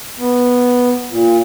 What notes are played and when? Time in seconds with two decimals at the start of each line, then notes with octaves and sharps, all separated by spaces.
0.19 B3
1.10 A#2